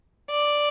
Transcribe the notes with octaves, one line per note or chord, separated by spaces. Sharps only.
D5